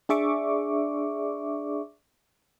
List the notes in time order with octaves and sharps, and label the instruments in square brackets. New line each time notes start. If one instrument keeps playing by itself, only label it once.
[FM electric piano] D4 G#4 D5 E5 C#6 D6